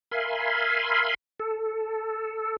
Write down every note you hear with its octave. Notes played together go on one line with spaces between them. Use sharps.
A#4 E5 F5 G#5 B5 C6
A4